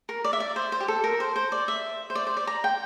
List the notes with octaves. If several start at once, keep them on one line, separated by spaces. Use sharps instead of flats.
A#4
D5
E5
D5
C5
C5
G4
A4
A#4
C5
C5
D5
E5
C5
D5
C5
D5
A#5
G5